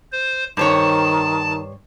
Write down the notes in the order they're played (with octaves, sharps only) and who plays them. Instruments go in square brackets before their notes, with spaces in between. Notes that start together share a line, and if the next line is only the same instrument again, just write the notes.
[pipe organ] C5
[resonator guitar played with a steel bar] G2 C5 C#5 [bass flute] D#3 [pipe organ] A5